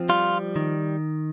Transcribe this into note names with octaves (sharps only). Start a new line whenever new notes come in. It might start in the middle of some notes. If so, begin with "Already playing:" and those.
Already playing: F3 C4
G3 F4
D#3